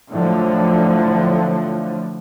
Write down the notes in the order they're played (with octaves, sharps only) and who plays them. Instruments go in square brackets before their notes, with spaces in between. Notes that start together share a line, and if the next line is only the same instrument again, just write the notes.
[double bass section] A2 D3 F3 F#3